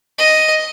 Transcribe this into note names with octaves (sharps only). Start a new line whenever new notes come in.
D#5